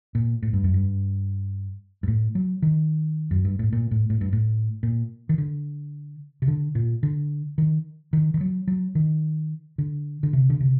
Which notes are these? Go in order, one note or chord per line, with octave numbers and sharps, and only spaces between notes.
A#2
A2
G2
F#2
G2
G2
A2
F#3
D#3
F#2
G2
A2
A#2
A2
A2
G2
A2
A#2
D#3
D3
C3
D3
A#2
D3
D#3
D#3
D#3
F#3
F#3
D#3
D3
D3
C3
D3
C3